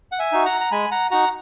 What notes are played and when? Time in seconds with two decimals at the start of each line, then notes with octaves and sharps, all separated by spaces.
0.12 F#5
0.19 E5 G#5
0.32 D#4 F#4
0.45 F#5 A#5
0.61 A#5
0.72 G#3 G#5 B5
0.91 F#5 A#5
1.11 D#4 F#4 F#5 A#5